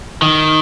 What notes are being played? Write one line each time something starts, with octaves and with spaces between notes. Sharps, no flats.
D#3